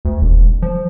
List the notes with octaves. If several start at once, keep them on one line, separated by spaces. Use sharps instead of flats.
D2
E1
F3